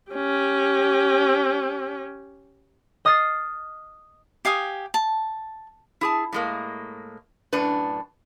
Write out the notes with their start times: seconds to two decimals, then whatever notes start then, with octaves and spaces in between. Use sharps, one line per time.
0.11 C#4 G4
3.05 D#5 D#6 F6 A6 C7
4.45 G4 F5 G#5 D#6
4.94 A5
6.01 E4 G#4 A5
6.33 A2 G#3 A#3
7.53 F#2 A2 D4 B4